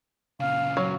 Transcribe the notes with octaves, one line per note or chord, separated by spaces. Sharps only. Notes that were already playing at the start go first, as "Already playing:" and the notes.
A#2 C#3 F5
F#3